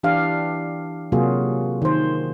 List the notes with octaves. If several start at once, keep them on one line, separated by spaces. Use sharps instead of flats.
E3 D4 G4 F5
C3 F#3 A#3 F4 F#4 G#4
D#3 C5